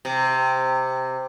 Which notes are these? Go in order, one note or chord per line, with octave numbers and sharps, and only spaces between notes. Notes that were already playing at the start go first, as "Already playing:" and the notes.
C3